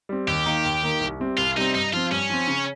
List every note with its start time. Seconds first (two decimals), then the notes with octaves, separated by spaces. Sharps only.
0.09 G3 C4
0.27 D#2 G4
0.46 D#3 A#3 D#4
0.65 D#2
0.83 D#3 A#3 D#4
1.01 C2
1.20 C3 G3 C4
1.37 C2 F4
1.56 C3 G3 C4 D#4
1.74 G2 D#4
1.93 F3 C4 F4
2.11 G2 C#4
2.30 F3 C4
2.48 C#3